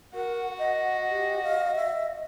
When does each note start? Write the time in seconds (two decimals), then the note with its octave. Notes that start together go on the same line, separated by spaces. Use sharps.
0.14 F#4 A#4 F#5
0.58 D#5 F#5
1.11 G4
1.43 F5
1.76 E5